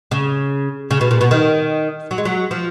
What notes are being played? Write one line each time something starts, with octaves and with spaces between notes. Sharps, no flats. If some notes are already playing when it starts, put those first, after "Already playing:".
C#3
C#3
B2
A#2
B2
D#3
F#3
G#3
F#3
F3